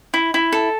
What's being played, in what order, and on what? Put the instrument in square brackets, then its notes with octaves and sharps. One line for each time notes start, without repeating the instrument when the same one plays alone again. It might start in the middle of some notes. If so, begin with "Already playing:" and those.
[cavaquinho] E4
E4
A4